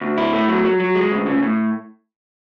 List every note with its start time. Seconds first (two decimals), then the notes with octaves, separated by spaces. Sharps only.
0.01 D2
0.18 E4
0.33 A3
0.48 F#3
0.65 F#3
0.80 F#3
0.95 G#3
1.11 D2
1.26 C#3
1.43 A2